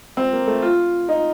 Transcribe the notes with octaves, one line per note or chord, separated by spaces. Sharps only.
C4
A#3
A3
F4
D#4